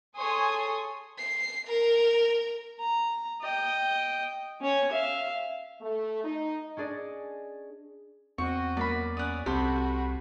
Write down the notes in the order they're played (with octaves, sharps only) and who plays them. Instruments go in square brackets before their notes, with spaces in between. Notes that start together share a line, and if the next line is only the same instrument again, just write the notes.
[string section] G#4 A4 C#5 G#5 C6 D#6
[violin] C7
A#4
[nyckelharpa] A#5
D#5 G5
C#4 C#5
E5 F5
[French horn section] A3
D#4
[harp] C#4 D4 G#4 D5 D#5
[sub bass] E2 [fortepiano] C4 [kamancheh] F#4 D#5 [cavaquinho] C#6
[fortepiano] F#2 A#3 [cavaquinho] D5 B5
[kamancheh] C#4 D5 [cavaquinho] F#5 D#6
[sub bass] C2 [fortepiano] C3 [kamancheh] F#4 B5 [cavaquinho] A4 C5